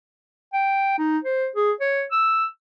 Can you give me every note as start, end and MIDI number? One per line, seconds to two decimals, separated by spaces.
0.53 0.95 79
0.98 1.18 63
1.24 1.47 72
1.56 1.72 68
1.81 2.04 73
2.11 2.45 88